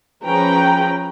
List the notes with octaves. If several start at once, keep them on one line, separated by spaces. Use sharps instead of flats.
F3 C#4 G#4 B4 G5 A#5